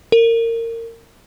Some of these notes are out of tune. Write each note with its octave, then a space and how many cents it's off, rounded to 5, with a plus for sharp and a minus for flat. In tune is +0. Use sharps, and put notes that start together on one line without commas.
A#4 -25